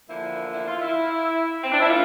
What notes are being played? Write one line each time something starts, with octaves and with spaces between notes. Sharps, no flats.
E2 D3 F3 A#3 E4
E4
F4
E4
C4
D4
E4
G3 A#3 F4